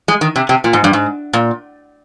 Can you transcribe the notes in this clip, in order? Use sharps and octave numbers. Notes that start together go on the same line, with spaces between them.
G#3
D#3
C3
C3
A#2
G#2
G2
G#2
A#2